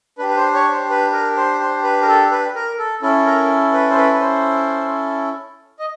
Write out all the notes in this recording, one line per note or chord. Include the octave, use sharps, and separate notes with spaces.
D4 G4 B4
B4
C5
C#5
C5
B4
A#4
C5
C5
B4
A#4
A4
B4
A#4
A4
C#4 E4 A4
A#4
B4
C5
B4
B4
C5
D#5